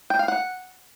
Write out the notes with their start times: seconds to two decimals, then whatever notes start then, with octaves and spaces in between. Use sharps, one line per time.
0.10 G5
0.19 F5
0.28 F#5